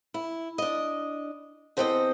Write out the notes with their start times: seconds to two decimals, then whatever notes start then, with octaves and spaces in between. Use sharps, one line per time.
0.14 E4
0.58 D4 D#5
1.77 E2 C4 G4 A4 C5 D#5